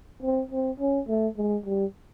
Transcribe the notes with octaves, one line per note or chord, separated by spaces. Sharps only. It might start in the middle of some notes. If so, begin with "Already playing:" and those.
C4
C4
C#4
A3
G#3
G3